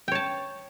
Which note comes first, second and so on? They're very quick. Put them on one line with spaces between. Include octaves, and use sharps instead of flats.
G5 C#5 A5